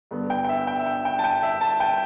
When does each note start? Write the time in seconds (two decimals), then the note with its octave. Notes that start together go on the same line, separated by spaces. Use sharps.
0.11 G2 D3 B3
0.30 G5
0.44 G5
0.49 E5
0.67 G5
0.79 E5
0.86 G5
1.05 G5
1.19 A5
1.24 G5
1.43 E5
1.61 A5
1.80 G5